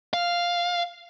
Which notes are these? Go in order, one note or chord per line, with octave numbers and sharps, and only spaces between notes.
F5